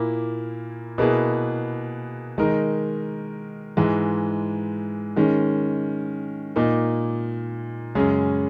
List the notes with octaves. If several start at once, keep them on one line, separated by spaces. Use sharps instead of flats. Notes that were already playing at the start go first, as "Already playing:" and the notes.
Already playing: A#2 A#3 E4
B2 A#3 E4 G#4 B4
D#3 G#3 D#4 A#4
G#2 E3 G#3
D#3 G#3 C#4
A#2 A#3 D#4
F#2 C#3 G#3 C#4 G#4